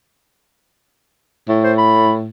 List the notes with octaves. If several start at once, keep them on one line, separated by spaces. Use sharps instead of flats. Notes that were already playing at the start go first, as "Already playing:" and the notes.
A2
C5
B5